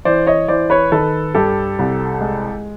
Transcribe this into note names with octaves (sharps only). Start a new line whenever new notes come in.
E3 C5 D5
C#5 D#5
E3 C5 D5
B4 C#5
D#3 A4 B4
G2 G4 A4
C2
G#3